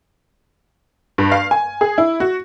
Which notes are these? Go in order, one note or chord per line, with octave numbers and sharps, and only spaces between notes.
G2
F5
G#5
G#4
E4
F#4